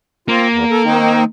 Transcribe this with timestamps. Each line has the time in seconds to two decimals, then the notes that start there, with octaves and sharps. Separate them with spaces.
0.28 A#3 C4 F4
0.52 E2
0.71 A4
0.84 D#3 C4 D#4